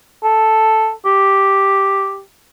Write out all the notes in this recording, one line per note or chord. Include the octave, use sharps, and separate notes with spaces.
A4
G4